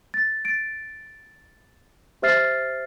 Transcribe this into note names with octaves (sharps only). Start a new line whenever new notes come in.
A6
A6 D7
G4 C5 E5 F6 A6 C7